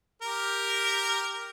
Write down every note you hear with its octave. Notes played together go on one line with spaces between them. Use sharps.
G4 A#4